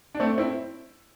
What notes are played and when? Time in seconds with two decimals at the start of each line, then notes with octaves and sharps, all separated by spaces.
0.15 D4
0.20 A3 C4
0.38 C4 E4